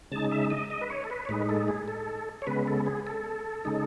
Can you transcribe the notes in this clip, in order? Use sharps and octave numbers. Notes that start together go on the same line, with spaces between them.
C#3 G#3 D#4 A5
E5
D#5
D#5
B4
C#5
A4
B4
C#5
A2 G#3 D#4 B4
A4
G#4
A4
C#5
C#3 G#3 B3 B4
A4
G#4
A4
C#3 G#3 D#4